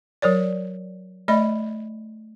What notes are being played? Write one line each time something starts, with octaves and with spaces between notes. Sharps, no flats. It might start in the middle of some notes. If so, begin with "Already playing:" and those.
F#3 A#4 C#5 D5
A3 D5 D#5 B5